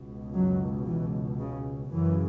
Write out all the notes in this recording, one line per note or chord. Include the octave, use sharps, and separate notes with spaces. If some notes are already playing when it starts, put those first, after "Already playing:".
Already playing: C#2 B2
F#2 F#3
E3
C#3
F#2 C#3 E3